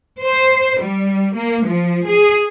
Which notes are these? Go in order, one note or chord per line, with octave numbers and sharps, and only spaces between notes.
C5
G3
A#3
F3
G#4